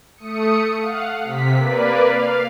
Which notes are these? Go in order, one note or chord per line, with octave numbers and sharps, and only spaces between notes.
A3 D#6 C#7
F5 F#5
C3 B6
A#3 B4 D5
F5